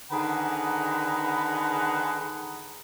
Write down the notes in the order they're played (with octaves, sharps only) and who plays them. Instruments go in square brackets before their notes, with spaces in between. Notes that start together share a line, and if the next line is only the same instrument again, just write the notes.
[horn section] D3 D#3 G#4 B4 F#5 A#5